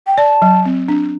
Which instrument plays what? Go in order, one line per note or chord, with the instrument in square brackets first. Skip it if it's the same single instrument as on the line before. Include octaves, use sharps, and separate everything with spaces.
[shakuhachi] G5
[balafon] D5 [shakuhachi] A5
[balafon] F#3
C4
D4